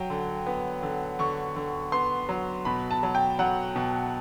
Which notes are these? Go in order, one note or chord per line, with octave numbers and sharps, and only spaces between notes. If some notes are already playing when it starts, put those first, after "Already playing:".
Already playing: F#3 G5
D3
B3
D3
D3 C#6
D3
B3 C6
F#3
B2 B5
A5
F#3
G5
F#3 F#5
B2